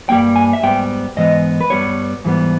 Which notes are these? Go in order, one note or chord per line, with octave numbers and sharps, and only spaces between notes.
G2 G3 A#3 G5
G#5
E5
G#2 G3 B3 G5
G#2 E3 G#3 B3 D#5
B4
G2 G3 B3 C#5
G#2 E3 G3 B3